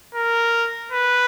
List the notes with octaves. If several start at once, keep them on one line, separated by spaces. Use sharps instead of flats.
A#4
B4